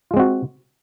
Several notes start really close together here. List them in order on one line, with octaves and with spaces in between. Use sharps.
F4 G#3 C4 F#4